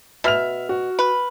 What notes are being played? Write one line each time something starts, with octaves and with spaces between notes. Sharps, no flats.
B2 E5 F6 F7
F#4
B4